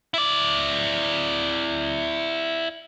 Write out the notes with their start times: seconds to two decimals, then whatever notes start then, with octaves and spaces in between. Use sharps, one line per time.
0.14 E4 D5